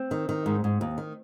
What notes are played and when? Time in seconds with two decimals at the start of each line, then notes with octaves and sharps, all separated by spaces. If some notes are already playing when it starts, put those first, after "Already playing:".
Already playing: C4
0.11 D#3
0.29 D#3
0.46 G#2
0.64 G#2
0.81 D#2
0.98 D#3